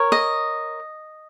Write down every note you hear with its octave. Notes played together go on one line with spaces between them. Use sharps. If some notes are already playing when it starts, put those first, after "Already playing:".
Already playing: A#4 C#5
D#5